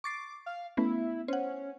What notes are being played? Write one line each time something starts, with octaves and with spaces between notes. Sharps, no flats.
C#6 D6 A6 C7
F5
A3 B3 C#4 E4
C#4 C5 F#5